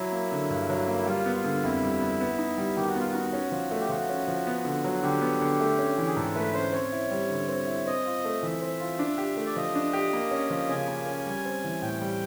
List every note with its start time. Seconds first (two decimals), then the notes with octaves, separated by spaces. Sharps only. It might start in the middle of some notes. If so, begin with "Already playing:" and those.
Already playing: F#3 E4
0.12 A#3
0.32 D3
0.50 G2
0.70 F#3
0.88 A#3
0.98 E4
1.06 G3 F4
1.26 B3
1.36 F4
1.44 D3
1.63 F2 E4
1.83 G3
2.01 B3
2.21 B3
2.39 D#4
2.58 G3
2.77 D#3 G4
2.88 F#4
2.95 B3 F4
3.11 D#4 F#4
3.33 C#4
3.52 F3
3.71 A3
3.80 G4
3.89 F3 F#4
4.09 C#4
4.28 F3
4.47 B3
4.65 D3
4.84 F#3
5.03 D3 G4
5.21 B3
5.41 D3
5.60 A3
5.79 C#4
5.98 E3
6.07 G#4
6.16 G#2 A4
6.35 A3 B4
6.54 C#4 C5
6.72 C4 C#5
6.92 E4
7.11 G3
7.30 D3
7.49 C4
7.67 E4
7.86 C4 D#5
8.06 F4
8.25 A3
8.43 E3 E5
8.62 C4
8.80 F4
8.99 D4
9.18 G4
9.37 A3
9.46 D5
9.56 F3 D#5
9.75 D4
9.93 G4
10.13 A#3
10.31 C#4
10.50 F3
10.69 C#3 G#5
10.88 A#3
11.07 C#4
11.27 G3
11.45 C4
11.64 E3
11.82 A2 G5
12.01 G3